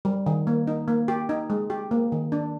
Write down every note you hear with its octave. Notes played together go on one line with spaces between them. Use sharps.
G3
D#3
A#3
D#4
A#3
G4
D#4
G#3
G4
A#3
D#3
D4